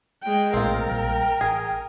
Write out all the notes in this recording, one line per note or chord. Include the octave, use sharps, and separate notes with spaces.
G#3 G5
A#1 A2 C4 F4 A#4
A#1 G3 G5
A1 G#4